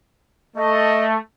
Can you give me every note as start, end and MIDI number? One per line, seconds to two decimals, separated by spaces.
0.56 1.16 57
0.56 1.05 75